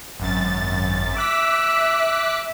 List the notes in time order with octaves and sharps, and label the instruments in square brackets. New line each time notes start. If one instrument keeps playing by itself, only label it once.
[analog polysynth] G#1 F#2 A6
[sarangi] E5 [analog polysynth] D6 F#6 B6